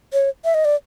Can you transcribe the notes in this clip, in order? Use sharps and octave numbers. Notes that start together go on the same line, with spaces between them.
C#5
E5
D#5
D5